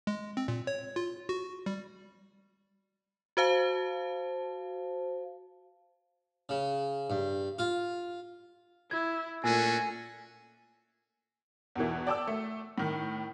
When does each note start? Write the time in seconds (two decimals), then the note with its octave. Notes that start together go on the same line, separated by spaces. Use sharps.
0.07 G#3
0.37 C4
0.48 A#2
0.67 C#5
0.96 F4
1.29 F#4
1.66 G3
3.37 F#4 C5 F5 A5
6.49 C#3
7.10 G2
7.59 F4
8.91 E4 G#6
9.44 A#2 A3 C#4 D4 F#4 G#5 E6 D#7
11.75 E2 B2 E3
12.07 D5 G5 A5 D6 E6
12.27 A3
12.78 A2 D#3